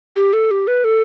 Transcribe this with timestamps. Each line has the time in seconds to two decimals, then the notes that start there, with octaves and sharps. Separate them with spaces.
0.16 G4
0.33 A4
0.51 G4
0.67 B4
0.84 A4